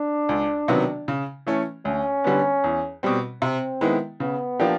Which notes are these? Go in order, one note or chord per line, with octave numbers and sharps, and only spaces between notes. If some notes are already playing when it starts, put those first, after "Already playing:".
Already playing: D4
C#2
C3 D#3 F#3 B3
C#3
E3 A3 C#4
D2 C#4
D3 G3 B3
E2
B2 G3 C4
C3 C4
D#3 G#3 B3 E4
C#3 B3
F3 A#3 D4 G4